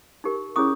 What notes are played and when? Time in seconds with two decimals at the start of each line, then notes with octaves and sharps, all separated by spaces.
0.24 D#4 G4 A#4
0.56 C#4 E4 G#4 C#5 C#6 D#6